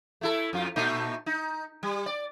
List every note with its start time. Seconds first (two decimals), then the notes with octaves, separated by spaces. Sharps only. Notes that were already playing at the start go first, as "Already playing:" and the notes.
0.21 A3 E4 A4
0.53 F2 F4
0.76 A#2 A3 D#4
1.26 D#4
1.83 G3
2.06 D5